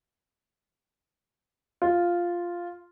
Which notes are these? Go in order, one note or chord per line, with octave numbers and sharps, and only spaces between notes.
F4